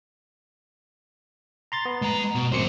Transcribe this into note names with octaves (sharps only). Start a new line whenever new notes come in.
A#5 C6 A6
B3
G#3 A#5
B2
G#1 F#2 A#2 C5 C#7